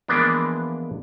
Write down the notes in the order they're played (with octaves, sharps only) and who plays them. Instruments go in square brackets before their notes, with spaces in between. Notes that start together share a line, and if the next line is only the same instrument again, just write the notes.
[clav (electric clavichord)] E3 F3 G#3 A#3 B3 D4